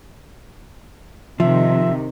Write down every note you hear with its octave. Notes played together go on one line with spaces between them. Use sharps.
C3 D#3 F3 E5